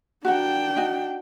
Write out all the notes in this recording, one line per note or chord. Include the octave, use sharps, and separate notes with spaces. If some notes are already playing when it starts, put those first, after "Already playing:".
D4 F#4 A#4 F#5 G5
D#4 F#4